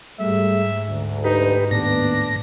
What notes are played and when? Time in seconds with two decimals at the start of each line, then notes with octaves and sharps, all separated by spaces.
0.20 G#2 G3 A3 G#4 E5
0.89 D2
1.24 D#4 G4 B4
1.71 D#2 A2 B3 D4 A#6